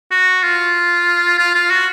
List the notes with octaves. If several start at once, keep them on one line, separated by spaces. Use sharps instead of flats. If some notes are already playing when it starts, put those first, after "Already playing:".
F#4
F4
F4
F4
F#4